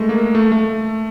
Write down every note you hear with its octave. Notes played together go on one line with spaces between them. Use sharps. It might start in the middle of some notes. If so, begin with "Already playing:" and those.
Already playing: G#3 A3
A#3
A3
A3